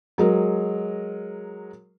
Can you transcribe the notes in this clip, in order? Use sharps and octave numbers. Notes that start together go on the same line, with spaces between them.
F#3 G#3 A#4